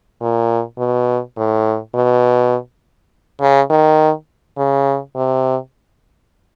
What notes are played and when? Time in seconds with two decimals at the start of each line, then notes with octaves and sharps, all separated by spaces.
0.21 A#2
0.78 B2
1.37 A2
1.94 B2
3.40 C#3
3.70 D#3
4.57 C#3
5.15 C3